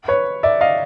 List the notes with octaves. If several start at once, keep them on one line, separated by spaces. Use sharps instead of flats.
B4 C#5
D5 E5
D#5 F5